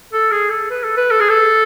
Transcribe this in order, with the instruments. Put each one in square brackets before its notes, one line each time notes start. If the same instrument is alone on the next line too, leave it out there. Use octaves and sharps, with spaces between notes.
[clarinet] A4
G#4
A4
B4
A4
B4
A4
G#4
A4